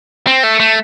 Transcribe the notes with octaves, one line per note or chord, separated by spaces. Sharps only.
C4
A3
A3